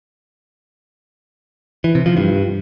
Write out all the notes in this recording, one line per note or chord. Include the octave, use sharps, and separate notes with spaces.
E3
C3
F3
G2